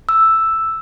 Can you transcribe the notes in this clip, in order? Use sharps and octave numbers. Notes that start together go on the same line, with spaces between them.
E6